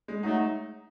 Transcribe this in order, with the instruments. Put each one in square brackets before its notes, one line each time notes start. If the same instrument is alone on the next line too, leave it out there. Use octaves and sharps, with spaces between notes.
[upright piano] G#3
[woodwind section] F#3 A3 [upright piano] D#4